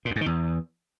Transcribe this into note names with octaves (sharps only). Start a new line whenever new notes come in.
A#2
F#2
G#2
D#3
E2